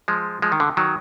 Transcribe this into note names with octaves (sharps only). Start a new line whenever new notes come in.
F3 G#3
F3 G#3
D#3
D3
D#3 F#3